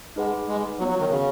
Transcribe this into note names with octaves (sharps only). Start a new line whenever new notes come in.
G#3 D#4 G#4 B4 F#5
G#3
F#3 B3 F#4 C#5
F#3
D#3
C#3